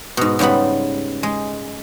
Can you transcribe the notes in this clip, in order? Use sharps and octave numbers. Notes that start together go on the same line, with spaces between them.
G#2 B2
G#2 C#3 G3 B3 B5
G#3